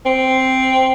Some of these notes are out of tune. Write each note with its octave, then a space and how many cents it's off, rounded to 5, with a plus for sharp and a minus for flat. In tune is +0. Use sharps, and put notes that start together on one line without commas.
C4 +0